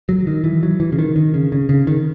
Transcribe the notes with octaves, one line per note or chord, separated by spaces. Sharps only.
F#3
D#3
E3
F#3
E3
C#3
D#3
D#3
C#3
C#3
C#3
D#3